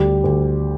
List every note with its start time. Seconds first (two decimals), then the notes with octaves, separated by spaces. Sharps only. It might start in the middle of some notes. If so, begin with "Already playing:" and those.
Already playing: D2 G3 G4
0.24 D2